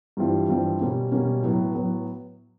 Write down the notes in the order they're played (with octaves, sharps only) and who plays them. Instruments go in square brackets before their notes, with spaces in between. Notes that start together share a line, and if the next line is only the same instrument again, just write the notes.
[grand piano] G2 E3 G3 C4 F4
G2 E3 G3 C4 F4
B2 G3 A#3 C#4
B2 G3 A#3 C#4
A2 F#3 B3
A2 F#3 B3